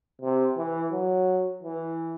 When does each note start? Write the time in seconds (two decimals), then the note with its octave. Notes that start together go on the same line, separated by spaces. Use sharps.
0.22 C3
0.57 E3
0.92 F#3
1.63 E3